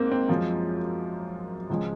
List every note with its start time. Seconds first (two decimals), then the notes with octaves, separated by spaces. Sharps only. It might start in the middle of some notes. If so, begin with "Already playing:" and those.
Already playing: G#2 A#3 C4
0.11 C4
0.29 F#2 F3 G#3 F4
1.70 C#2 C#3 F3 G#3